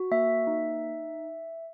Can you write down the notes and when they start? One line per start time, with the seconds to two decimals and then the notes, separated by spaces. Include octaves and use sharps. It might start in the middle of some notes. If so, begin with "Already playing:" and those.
Already playing: F#4
0.11 A#3 E5
0.47 D#4